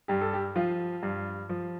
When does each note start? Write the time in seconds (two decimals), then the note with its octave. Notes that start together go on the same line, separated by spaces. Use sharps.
0.08 G2 G4
0.21 A4
0.33 G4
0.56 F3 F4
1.03 G2
1.49 F3